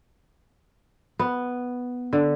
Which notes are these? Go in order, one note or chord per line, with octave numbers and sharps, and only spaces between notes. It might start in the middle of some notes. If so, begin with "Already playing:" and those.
B3
D3